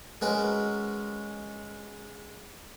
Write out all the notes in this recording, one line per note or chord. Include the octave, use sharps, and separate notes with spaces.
G#3 C#4 F#4 A#4 B4